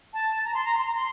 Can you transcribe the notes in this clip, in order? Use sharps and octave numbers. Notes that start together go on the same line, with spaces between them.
A5
A#5
C6
A#5
C6
A#5
C6